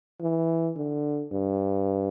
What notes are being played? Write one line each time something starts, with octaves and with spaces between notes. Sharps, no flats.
E3
D3
G2